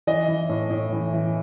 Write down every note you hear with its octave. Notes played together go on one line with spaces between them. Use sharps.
E3 D#5
E3
A2
A2
E3
E3